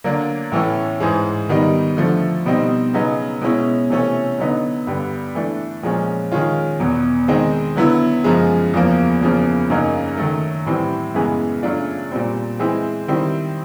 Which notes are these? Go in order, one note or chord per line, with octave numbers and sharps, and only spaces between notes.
D3 F#3 A#3 D4
A2 E3 A3 C#4
G#2 E3 G#3
D#3 G3 B3 D#4
D3 F3 A3
B2 G3 C4 D#4
C#3 F#3 B3 D#4
B2 G#3 C#4 E4
C3 E3 A3 C#4
D3 F#3 B3 D#4
G2 D3 G3 B3
E3 A3 D4
A#2 F3 G#3 C#4
D#3 G#3 C#4 F4
E2 B2 F#3
D#3 G#3 C4 D#4
D3 F#3 B3 E4
F#2 C#3 F3 G#3
E2 C#3 F3 A#3
E2 C#3 F3 A#3
F#2 C#3 F#3 A#3 D#4
D#3 F#3 A3
A2 E3 G3 C4
F#2 C#3 E3 G#3 B3
C#3 F#3 A3 D4 F4
A#2 G3 C4
E3 G#3 C4 E4
D#3 G3 C4 E4